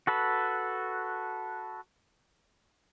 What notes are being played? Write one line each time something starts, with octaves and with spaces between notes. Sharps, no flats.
F#4 A4 B4